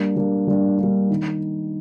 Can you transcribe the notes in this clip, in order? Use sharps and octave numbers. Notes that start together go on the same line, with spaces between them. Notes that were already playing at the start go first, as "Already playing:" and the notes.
Already playing: G3 A#3 D4
G3 A#3 D4
G3 A#3 D4
G3 A#3 D4
D#3